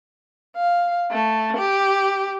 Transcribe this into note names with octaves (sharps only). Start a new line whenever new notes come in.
F5
A3
G4